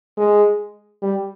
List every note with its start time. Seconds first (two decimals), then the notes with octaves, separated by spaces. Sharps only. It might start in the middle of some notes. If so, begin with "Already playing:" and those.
0.17 G#3
1.02 G3